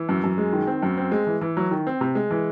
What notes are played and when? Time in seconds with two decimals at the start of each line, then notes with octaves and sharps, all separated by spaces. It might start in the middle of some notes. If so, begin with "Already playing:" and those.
Already playing: E3
0.09 F#2
0.24 F#2
0.38 G#3
0.53 D#3
0.67 C4
0.83 F#2
0.97 C4
1.12 G#3
1.27 E3
1.41 E3
1.57 F#3
1.71 D#3
1.87 C4
2.01 C3
2.15 G#3
2.31 E3